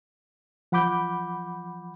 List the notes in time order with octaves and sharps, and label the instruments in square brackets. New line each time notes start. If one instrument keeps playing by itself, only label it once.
[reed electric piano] F3 F#5 B5 D6 G6